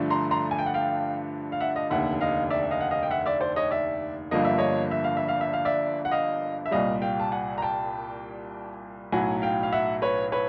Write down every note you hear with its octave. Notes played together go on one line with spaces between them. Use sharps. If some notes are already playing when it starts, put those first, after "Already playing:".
Already playing: G2 D3 F3 A3 D4
A#5 C6
A#5 C6
G#5
G5
F#5
F5 G5
F5
E5 F#5
D#5 F5
F1 D#2 D3 E5 F#5
D#5 F5
D5 E5
E5
D#5 F5
F#5
D#5 F5
G5
E5 F#5
D5 E5
C5 D5
C#5 D#5
D5 E5
G1 G2 D3 F3 A#3 D#5
E5
C#5 D#5
E5
F5
E5
F5
E5
F5
D5 E5
F#5
D#5 F5
E5
C2 A#2 G3 D#5 F5
F5 G5
A5
F#5 G#5
A#5
G5 A5
B1 A2 F#3 F#5 G#5
F5 G5
F5
E5 F#5
B4 C#5
B4 C#5